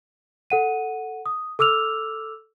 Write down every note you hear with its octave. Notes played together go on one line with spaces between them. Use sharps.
A4 F#5 D#7
D#6
A4 D6 E6 F6 F7